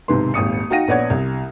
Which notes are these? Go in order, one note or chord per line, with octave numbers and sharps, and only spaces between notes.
B1 G#2 C3 D#3 B4 C6
D#1 G#1 D#6 C#7
D#4 F#4 F5 G5 A#6 D#7
A#1 B3 C#5 D5 F#5 G#6
C2